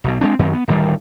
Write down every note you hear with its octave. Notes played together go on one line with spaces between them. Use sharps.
B1 B2
G#3 A#3 C4 D4
F#2 D#3 F#3 C4
B3
D1 G2 D#3 G3